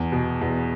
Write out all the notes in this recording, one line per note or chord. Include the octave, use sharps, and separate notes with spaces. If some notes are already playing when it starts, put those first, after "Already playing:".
Already playing: E2
B2
E2